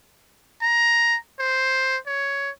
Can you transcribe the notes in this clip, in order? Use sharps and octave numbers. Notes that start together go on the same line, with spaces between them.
A#5
C5
C#5